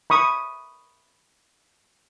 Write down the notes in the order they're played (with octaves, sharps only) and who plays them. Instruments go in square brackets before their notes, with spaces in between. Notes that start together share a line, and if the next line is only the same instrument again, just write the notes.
[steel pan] B5 C#6 D#6